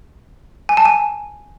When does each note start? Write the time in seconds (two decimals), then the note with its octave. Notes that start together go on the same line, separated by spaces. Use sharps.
0.69 G#5
0.77 A5
0.85 G#5